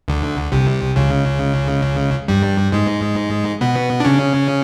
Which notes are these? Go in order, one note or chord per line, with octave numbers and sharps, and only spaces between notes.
D2 D3
C2 C3
C#2 C#3
G2 G3
G#2 G#3
B2 B3
D4
C#3 C#4